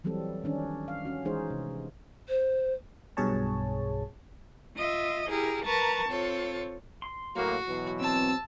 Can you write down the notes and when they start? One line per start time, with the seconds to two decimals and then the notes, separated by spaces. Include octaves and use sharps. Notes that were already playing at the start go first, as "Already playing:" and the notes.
0.04 E3 F#3 G3 C4 A4
0.44 D#3 C#4 D4
0.88 F5
1.05 C#4 F#4
1.25 E3 G#3 D#4 G#4 C5
1.50 C3
2.29 C5
3.17 B1 G2 B2 G#4 C#5 A5
4.76 F4 D#5 E5
5.29 E4 G4 G#4 A#4
5.64 A#4 B4 A5 A#5 C#6
6.09 C4 F4 A4 C#5
7.02 C6
7.36 A2 F#3 A#3 F#4
7.67 B2 E3 F#3
8.00 C4 A5 E6